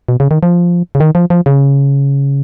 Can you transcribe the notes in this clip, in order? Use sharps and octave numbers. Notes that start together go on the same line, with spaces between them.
B2
C#3
D#3
F3
C#3
D#3
F3
F3
C#3